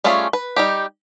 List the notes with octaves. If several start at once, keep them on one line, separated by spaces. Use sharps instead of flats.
G3 A3 C#4 F4 G#4
B4
G3 D#4 G4